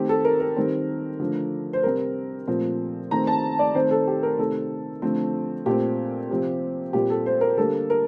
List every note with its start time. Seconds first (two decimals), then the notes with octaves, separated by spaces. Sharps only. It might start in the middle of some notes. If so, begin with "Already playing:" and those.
Already playing: D#3 A3 C4 G4
0.09 A4
0.25 A#4
0.40 A#4
0.56 D#3 G3 C4
1.20 D3 F3 A3
1.73 C5
1.83 C3 G3 C4 A#4
2.48 A#2 F3 A3 C4
3.11 D#3 A3 C4 A#5
3.27 A5
3.59 D5
3.75 D#3 A3 C4 C5
3.91 A4
4.08 G4
4.23 A#4
4.38 C3 D#3 A3 C4 A4
5.02 D3 F3 A3 C4
5.66 A#2 A3 C4 G4
6.29 C3 F3 C4
6.93 A#2 G3 C4 G4
7.10 A4
7.26 C5
7.41 A#4
7.57 D3 G3 A#3 A4
7.90 A#4